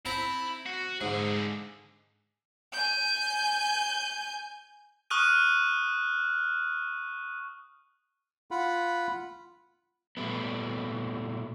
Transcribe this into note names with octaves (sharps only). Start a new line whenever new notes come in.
C4 E4 A5 A#5
F#4
G#2 D3 G#4
G#5 G6
C#6 D#6 F6 F#6 D#7
F4 F#5 B5
A#2 G3 A3 B3